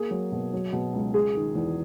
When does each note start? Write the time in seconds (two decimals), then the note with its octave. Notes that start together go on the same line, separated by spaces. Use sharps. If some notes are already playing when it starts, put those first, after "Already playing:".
Already playing: A#3 G#4
0.11 F#3
0.32 B2
0.53 F#3
0.73 B2
0.94 C#2
1.14 G#3 G#4
1.35 D#3
1.55 E2